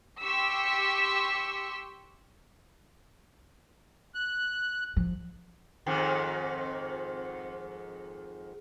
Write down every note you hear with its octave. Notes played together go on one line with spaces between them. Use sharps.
G4 C6 C#6 E6 B6
F#6
F3
F2 G#2 D#3